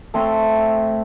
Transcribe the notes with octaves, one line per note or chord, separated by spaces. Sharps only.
A3 C4 C6 C#6